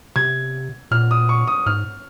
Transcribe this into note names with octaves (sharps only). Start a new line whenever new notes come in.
C3 G#6
A#2 F6
D#6
C#6
D#6
G#2 F6